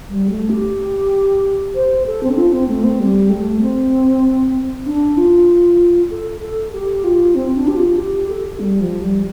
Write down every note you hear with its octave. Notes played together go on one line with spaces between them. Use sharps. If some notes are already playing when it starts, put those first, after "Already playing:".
G3
A3
G4
C5
A4
C4
D4
F4
C4
A3
C4
G3
A3
C4
D4
F4
A4
A4
G4
F4
C4
D4
G4
F4
G4
A4
G3
F3
G3